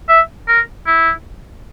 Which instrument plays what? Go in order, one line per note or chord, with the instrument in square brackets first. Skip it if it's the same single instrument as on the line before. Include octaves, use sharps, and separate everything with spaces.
[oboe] E5
A#4
E4